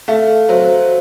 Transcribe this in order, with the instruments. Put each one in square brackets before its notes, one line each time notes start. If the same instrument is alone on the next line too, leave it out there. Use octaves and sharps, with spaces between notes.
[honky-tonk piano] A3 [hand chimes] F5
[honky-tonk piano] F#3 [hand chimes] C5